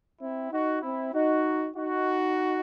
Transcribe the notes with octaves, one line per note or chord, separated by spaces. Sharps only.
C4 E4
D#4 F#4
C4 E4
D#4 F#4
D#4 F#4